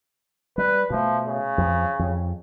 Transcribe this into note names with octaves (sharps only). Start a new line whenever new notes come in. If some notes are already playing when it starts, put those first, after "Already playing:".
G3 B4
B2 F3 A3
C#3
F2 F3
F2